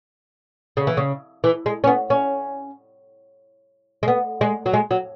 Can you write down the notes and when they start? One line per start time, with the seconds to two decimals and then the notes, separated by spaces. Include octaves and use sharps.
0.77 C#3
0.87 E3
0.97 C#3
1.44 E3
1.66 G#3
1.84 C#4
1.87 B3
2.10 C#4
4.03 G#3
4.08 B3
4.41 G#3
4.66 F#3
4.74 G#3
4.91 F#3